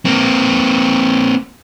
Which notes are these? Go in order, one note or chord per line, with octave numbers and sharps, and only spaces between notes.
A#3 C4